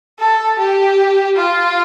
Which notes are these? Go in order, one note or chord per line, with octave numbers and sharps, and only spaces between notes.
A4
G4
F4